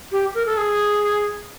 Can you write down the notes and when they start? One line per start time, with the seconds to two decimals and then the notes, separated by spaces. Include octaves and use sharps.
0.12 G4
0.35 A#4
0.46 A4
0.57 G#4